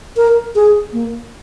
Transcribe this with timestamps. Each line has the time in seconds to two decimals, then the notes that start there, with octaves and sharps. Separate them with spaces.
0.17 A#4
0.55 G#4
0.93 A#3